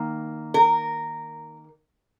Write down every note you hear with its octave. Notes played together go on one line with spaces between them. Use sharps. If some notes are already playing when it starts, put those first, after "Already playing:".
Already playing: D#3 A#3
A#4